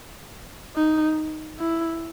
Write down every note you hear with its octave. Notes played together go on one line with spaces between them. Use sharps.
D#4
E4